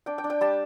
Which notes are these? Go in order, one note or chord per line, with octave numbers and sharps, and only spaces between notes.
D4 G5
G5
D4
G5
G3 A5